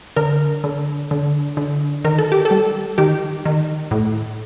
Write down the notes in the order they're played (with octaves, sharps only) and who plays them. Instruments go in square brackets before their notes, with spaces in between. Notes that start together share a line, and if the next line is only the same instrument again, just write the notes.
[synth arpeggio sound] D3 A#4
D3
D3
D3
D#3 A#4
A4
G4
A4
G3
D#3 G4
D#3
A2